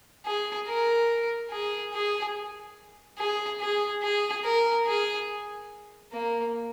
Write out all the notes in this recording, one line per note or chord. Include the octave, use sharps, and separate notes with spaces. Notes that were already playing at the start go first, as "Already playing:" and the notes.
G#4
A#4
G#4
G#4
G#4
G#4
G#4
A#4
G#4
A#3